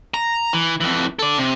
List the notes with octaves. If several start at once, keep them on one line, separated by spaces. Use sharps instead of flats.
A#5
E3
F2 E3
A4 D5
C3